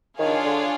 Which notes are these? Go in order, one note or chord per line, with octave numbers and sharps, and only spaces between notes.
D#3 D4 F4 G#4 C#5 F5
D3